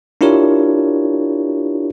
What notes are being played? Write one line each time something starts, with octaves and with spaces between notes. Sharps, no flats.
D4 E4 F4 G4 A#4 C#5